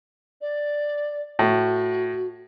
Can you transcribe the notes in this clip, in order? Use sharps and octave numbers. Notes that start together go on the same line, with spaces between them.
D5
A2 F#4